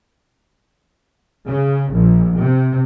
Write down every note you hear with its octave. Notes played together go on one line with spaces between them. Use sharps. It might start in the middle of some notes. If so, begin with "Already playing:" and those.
C#3
A#1
C3